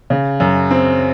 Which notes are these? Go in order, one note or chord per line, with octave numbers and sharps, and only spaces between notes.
C#3
F#2
C4